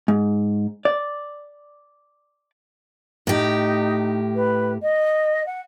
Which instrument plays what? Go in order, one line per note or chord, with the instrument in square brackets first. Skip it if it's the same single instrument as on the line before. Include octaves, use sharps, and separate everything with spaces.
[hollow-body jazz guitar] G#2
D5
[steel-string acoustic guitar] A2 G4 [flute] D#4
[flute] B4
D#5
F#5